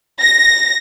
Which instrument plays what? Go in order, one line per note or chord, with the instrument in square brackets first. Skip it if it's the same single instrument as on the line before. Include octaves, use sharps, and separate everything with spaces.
[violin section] A#6